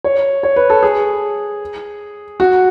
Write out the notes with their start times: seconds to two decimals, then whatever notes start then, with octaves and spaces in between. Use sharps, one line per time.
0.04 C#5
0.43 C#5
0.56 B4
0.70 A4
0.83 G#4
2.40 F#4